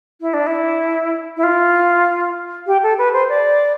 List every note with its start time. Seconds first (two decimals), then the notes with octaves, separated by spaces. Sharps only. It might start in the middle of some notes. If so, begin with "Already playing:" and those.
0.21 E4
0.33 D4
0.47 E4
1.37 E4
1.43 F4
2.67 G4
2.83 A4
2.98 B4
3.13 C5
3.29 D5